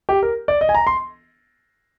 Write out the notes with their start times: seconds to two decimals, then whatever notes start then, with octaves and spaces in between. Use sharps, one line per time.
0.09 G4
0.23 A#4
0.48 D5
0.61 D#5
0.69 G#5
0.75 A#5
0.87 C6